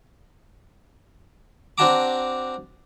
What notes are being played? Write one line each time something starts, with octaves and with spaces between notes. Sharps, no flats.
C4 D4 F#4 A5 A#5 D6